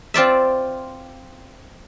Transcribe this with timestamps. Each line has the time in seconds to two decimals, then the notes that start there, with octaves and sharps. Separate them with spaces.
0.14 C4 F4 D5 E5